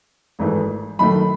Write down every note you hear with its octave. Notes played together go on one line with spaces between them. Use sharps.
G#1 G#2 E3 A3
F#1 F#2 D#3 A3 B5